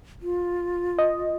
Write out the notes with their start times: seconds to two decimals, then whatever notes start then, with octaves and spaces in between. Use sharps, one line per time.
0.22 F4
0.99 D#5